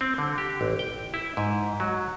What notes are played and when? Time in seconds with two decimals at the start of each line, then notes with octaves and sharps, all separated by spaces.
0.01 C4
0.18 D3
0.38 G4
0.61 A1
0.79 G5
1.14 E4
1.37 G#2
1.80 F#3